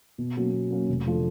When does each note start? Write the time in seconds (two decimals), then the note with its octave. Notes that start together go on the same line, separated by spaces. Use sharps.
0.18 B2
0.36 F#3 A#3 C#4 F#4
0.53 B2
0.71 F#3 A#3 C#4 F#4
0.89 F1
1.07 D3 F3 A3